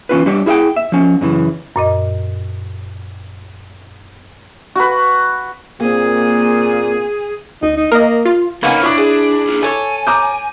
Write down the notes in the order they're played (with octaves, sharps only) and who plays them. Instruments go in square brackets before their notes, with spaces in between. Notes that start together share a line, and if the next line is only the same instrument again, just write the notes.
[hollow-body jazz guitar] E3 C#4 F4 B4
G3 D4 G4 C#5
E4 G#4 E5 F#5 G5
E5
F3 C#4
F#2 C#3 E3
[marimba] F#2 A#2 D#5
[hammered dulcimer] F#4 B4
[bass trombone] A#2 [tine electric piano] A#3 C4 [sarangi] G#4
[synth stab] D2 [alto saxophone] D#4
[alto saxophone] D#4
[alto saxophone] A#3 [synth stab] A#4 D#5
[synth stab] F4
[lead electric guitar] C3 D#4 [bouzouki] A#3 B3 C#4
[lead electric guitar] D4 [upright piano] E4 D6 [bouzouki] C#5
[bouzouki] G#4
[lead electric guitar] D4 F4
[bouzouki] A4 C#5 [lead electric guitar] G#5
[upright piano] A#5 D6 G6